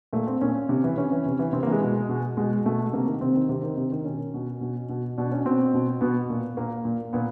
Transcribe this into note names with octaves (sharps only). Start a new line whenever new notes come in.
A#2 A3
C4
A#2 C#4
C3
E3
C3 C#4
E3
C3
E3
C3 C4
A#3
E3
G#3
B2
B2
B2 G#3
B2 A3
C3 A#3
D#3
C3 C4
D#3
C3 C4
D#3
C3
D#3
B2 C#4
B2
B2
B2
B2 D4
C#4
B2 C4
B2
B2 B3
A#2
A#2 A#3
A#2
A#2 B3